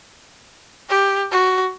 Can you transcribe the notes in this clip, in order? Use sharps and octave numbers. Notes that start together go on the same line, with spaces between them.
G4
F#4